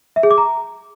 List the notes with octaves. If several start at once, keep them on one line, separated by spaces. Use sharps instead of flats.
E5
G#4
D6
A#5